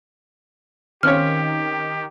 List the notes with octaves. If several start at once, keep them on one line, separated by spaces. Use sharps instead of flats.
D#3 C4 C#4 G4 C#5 F5 F6